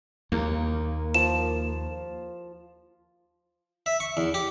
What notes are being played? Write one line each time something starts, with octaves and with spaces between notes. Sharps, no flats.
D#2 A#3
F3 E7
E5
C#6
E2
G4